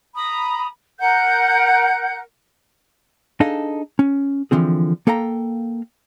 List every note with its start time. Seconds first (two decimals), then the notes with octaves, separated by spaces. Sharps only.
0.14 A#5 B5 D#6
0.99 A#4 F#5 F#6 G6
3.40 D4 D#4 G#4 A4 D#5 F5
3.99 C#4
4.51 D3 E3 F3 C4 G#4
5.07 A#3 A4 F5 G5 A#5